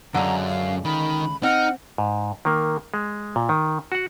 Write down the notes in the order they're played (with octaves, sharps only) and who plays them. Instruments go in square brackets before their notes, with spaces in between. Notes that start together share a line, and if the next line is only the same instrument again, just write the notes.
[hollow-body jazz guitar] C#2 D3 [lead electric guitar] F#2 [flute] A#5
[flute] F5
[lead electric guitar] D#3 [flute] B5
[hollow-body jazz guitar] C4 [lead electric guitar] D#4 [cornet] F#5 [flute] F6
[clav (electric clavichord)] G#2
D#3 A#3
G#3
A#2
D#3
F#4 F#5